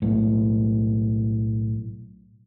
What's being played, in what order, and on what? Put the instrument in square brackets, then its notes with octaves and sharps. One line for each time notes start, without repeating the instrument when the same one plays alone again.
[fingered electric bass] B1 A2